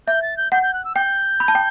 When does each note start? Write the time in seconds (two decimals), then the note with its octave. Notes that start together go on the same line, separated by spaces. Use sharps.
0.07 E5 G6
0.22 A6
0.37 G6
0.52 F#5 G6
0.63 G6
0.74 F#6
0.85 E6
0.95 G5 G6
1.40 B5
1.48 A5
1.55 G5